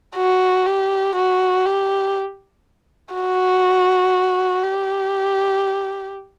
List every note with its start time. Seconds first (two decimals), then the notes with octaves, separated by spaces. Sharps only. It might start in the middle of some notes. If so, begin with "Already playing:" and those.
0.17 F#4
0.67 G4
1.16 F#4
1.66 G4
3.14 F#4
4.62 G4